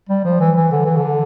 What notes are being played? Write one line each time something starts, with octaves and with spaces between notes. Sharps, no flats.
G3
F3
E3
E3
D3
E3
D3